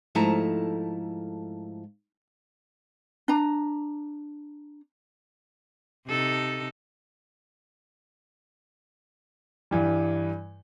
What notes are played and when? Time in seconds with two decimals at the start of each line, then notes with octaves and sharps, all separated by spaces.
0.15 G#2 F3 A3 E4 A5 A#5
3.28 D4 A#5
6.07 C3 D#4 A4
9.71 G2 E3 G3